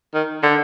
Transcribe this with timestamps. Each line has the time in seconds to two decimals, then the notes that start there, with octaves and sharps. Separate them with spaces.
0.14 D#3
0.43 D3